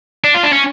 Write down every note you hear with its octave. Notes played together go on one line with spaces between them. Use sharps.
D4
F4
D4
C#4